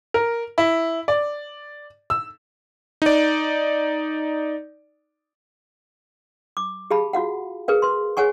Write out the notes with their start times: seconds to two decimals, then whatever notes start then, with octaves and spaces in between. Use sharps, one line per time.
0.14 A#4
0.58 E4
1.08 D5
2.10 E6
3.02 D#4 D5
6.57 D6
6.91 G4 G#4 F5 A5 B5
7.13 F4 F#4 F5 F#5
7.68 G#4 A#4 B4 F5
7.82 B4 C6
8.17 G#4 C#5 F#5 G#5 C#6